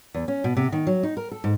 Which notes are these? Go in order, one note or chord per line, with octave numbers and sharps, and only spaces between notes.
E2
C#4
B2
C3
D#3
F#3
D#4
A#4
A4
G#2